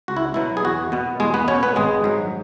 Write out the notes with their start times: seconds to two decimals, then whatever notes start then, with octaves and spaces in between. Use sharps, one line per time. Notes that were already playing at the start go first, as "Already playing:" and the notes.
0.08 C#2 F#4
0.17 E4
0.34 B2 F#3 E4
0.57 G#4
0.65 E2 F#4
0.92 B2 B3
1.20 E2 G#3 G#4
1.34 B3 B4
1.48 B2 B3 C#4 C#5
1.63 B3 B4
1.76 G#1 G#3 G#4
2.04 G#2 F#3